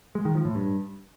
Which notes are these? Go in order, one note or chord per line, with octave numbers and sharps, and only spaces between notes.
G#3
D#3
F3
A2
G2